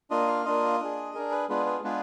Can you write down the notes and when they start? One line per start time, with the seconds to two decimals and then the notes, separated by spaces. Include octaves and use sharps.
0.10 A#3 D4 F4 D#5
0.28 F5
0.45 A#3 D4 F4 D#5
0.80 D4 G#4
1.14 D4 G#4 A#4
1.32 B4
1.49 G#3 B3 D4 F4 G#4 B4
1.66 B4
1.84 G#3 B3 D4 F4 G#4 B4